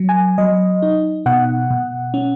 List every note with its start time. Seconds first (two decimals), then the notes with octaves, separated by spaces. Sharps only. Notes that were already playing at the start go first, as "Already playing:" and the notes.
Already playing: F#3
0.09 G#5
0.38 F#3 D#5
0.82 D#4
1.26 B2 F#5
1.70 B2
2.14 C#4